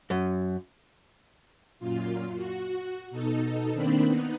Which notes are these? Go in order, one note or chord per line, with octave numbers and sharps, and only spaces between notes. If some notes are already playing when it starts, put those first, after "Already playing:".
F#2
F#2 A#2 F4
F#4
B2 D#4 A4
D#3 A#3 C4 D4 B5
B3 D#4